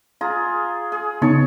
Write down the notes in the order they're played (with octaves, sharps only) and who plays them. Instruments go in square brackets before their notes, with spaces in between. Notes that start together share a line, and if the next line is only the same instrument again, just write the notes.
[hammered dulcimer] F4 G#4 A#5
G#4
[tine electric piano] C#3 B3 D#4 [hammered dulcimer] C#5 A5 C#6